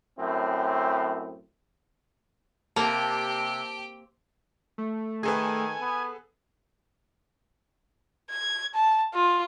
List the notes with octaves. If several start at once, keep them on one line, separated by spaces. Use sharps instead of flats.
F#2 A2 C4
C3 A#3 G4 G5 A5
A3
D#3 G#4 A4 B4 G#5
B3
G#6
A5
F4